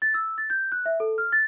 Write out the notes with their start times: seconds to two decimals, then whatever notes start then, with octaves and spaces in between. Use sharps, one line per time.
0.02 A6
0.14 E6
0.38 A6
0.50 G6
0.72 F#6
0.86 E5
1.00 A4
1.18 F6
1.32 A6